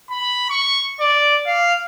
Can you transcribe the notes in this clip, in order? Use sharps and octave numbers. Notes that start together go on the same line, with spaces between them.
B5
C#6
D5
F5